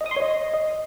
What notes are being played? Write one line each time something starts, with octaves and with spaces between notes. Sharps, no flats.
D#5
D#6
C6
C#5
D#5